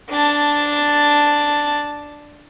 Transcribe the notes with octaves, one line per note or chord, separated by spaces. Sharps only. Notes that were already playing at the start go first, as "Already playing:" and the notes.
D4 A5